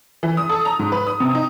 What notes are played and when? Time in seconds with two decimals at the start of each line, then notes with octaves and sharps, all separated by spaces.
0.23 E3
0.37 D#6
0.49 A4
0.65 A#5
0.79 G#2
0.92 B4
1.07 D#6
1.20 C3
1.35 D#4